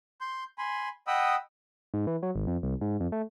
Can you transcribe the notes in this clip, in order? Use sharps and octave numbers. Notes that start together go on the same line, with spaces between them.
C6 G6
G#5 B5 C6
D#5 F#5 G5 B5 D#6 E6
G#2
E3
F#3
G#1
F2
C2
G#2
F2
A3